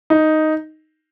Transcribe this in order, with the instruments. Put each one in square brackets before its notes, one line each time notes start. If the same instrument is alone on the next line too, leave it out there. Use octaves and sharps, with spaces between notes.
[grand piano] D#4